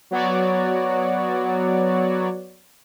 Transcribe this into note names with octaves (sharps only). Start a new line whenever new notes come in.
F#3 B3 F#4 C#5 D5